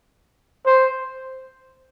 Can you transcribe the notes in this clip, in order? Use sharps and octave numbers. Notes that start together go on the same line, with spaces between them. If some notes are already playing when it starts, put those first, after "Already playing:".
C5